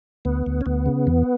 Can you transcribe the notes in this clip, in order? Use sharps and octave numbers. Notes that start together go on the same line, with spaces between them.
D2 B3
D2
C#4
D2 B3
C#3
E2